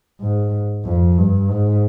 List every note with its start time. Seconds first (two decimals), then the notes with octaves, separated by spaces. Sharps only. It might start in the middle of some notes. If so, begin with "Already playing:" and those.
0.21 G#2
0.85 F2
1.18 G2
1.51 G#2